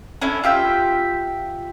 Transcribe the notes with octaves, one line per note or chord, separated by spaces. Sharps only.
C#4 D4 E4 A4
F4 G4 E5 G5